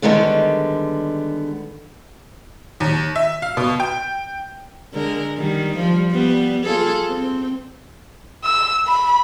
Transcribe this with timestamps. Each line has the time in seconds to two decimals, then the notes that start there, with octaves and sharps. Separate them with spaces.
0.02 D3 D#3 G3 G#3 B3
2.80 D#2
3.16 E5
3.42 F5
3.57 B2
3.80 G5
4.93 D3 G#3 A#4
5.37 D#3 G3
5.77 F3 G3
6.11 G3 B3
6.63 F4 G#4 A4
7.07 C4
8.44 E6
8.87 B5